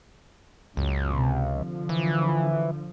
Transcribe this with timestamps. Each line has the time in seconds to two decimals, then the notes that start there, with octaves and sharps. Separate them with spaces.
0.77 C#2 F#2
1.15 C3
1.53 D3 F3
1.89 E3